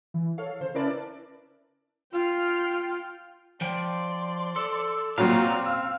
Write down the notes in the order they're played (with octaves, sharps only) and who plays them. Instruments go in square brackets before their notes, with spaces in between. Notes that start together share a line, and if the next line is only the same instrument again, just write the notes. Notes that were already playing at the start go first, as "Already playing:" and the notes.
[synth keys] E3
A4 C#5 F5
C#3 C5
C#4 E4 A#4 B4 D5 A5
[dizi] F4 [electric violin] G5 F6
[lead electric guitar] F3 G5 [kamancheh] D5 C6
[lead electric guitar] A4
[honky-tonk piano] A#2 F#3 [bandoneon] C4 [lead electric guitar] F5
[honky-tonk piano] E6